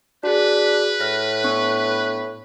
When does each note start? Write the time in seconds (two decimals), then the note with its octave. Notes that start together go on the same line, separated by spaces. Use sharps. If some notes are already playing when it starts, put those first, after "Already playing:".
0.23 D4 F#4 G#4 B4
1.00 A2 F6 A#6
1.44 B3 D4 C#6